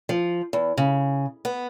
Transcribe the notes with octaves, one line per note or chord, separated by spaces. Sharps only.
F3
E2
C#3
B3